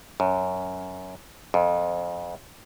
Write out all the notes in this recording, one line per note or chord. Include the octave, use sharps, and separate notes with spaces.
F#2
F2